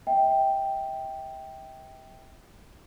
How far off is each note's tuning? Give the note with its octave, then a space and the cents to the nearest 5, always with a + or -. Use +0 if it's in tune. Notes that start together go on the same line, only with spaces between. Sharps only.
E5 -40 G5 +0